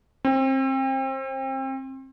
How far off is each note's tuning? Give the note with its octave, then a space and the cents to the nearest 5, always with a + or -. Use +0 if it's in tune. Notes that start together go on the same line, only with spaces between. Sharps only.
C4 +30